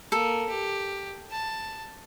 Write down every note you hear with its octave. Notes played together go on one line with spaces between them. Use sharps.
A#3 A4
G4
A5